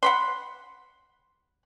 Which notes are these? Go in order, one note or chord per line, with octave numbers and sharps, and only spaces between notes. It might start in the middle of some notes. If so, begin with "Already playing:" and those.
F#5 B5 C6